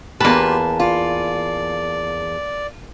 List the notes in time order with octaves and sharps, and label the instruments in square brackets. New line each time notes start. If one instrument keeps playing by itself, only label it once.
[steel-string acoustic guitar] E2 A5 [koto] A#3 B4 [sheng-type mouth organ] F4 G4
[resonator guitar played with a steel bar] F4 [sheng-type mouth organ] D5